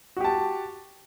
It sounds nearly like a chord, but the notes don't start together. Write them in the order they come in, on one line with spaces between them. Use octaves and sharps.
F#4 G4 A5